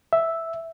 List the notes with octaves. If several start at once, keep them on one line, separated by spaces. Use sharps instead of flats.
E5